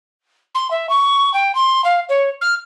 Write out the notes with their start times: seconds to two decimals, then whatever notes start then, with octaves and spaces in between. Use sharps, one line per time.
0.55 C6
0.71 E5
0.89 C#6
1.34 G5
1.55 C6
1.84 F5
2.09 C#5
2.41 F6